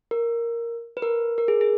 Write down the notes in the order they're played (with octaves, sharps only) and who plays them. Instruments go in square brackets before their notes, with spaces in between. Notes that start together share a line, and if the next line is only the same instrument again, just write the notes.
[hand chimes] A#4
B4
A#4
A#4
G#4
G#4